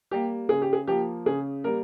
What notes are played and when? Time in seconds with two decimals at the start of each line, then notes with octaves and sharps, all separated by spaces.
0.11 G3 A#3 G4
0.49 C#3 G#4
0.62 G4
0.73 G#4
0.88 F3 A#3 G4
1.26 C#3 G#4
1.64 G3 A#3 A#4